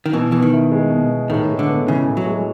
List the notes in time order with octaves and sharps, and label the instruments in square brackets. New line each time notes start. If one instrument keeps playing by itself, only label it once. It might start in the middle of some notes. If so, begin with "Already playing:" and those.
[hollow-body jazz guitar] D#3
[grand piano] B2 [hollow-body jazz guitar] E3
[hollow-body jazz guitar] E3 [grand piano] B3
[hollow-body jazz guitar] D#3
[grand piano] E4
G#3
B2
B3
[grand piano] A2 [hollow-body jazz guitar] D#3
[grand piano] G#3
[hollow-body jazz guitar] D3
[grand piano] B3
[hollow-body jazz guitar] C#3 [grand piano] E3
[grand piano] A2
[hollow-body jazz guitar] F#3
[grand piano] G#3